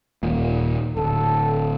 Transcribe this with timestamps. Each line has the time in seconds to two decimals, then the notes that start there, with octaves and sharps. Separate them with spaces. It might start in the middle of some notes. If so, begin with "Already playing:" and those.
0.23 D#1 A#2
0.97 D1 A4